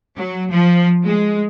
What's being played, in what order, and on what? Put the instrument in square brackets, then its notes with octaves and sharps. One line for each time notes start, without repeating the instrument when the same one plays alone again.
[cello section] F#3
F3
G#3